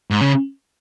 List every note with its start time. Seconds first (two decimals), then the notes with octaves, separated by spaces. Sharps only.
0.11 G#2
0.21 C#3